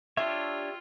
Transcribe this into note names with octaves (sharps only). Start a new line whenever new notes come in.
D4 F4 G4 C#5 E5